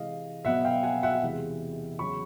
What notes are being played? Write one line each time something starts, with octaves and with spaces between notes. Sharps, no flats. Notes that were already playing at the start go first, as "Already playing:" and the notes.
Already playing: C3 E3 G#3 D#5 F5
B2 F#3 B3 E5 F#5
F5 G5
F#5 G#5
E5 F#5
E2 C3 E3 G#3
E2 C#3 F#3 B5 C#6